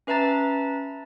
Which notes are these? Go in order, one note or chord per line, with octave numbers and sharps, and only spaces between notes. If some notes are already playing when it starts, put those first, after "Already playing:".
C#4 B4 E5 A5 A#5 A6